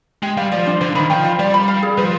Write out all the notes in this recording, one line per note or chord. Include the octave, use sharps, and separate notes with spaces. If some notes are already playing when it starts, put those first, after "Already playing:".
G#3 G4
G3 F5
F3 D5
D4
D3 C5
D#3 B5
F3 G5
F4
G3 D5
B5
F5
G#4
F3 B4